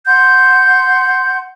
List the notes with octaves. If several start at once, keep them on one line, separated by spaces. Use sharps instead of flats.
F#5 C6 G6